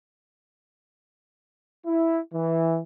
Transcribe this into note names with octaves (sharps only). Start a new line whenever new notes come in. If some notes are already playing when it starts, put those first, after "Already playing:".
E4
E3